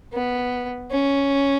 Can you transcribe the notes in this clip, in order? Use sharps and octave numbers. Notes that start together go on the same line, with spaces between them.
B3
C#4